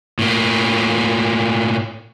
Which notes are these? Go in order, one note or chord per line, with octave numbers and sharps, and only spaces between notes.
A2 A#3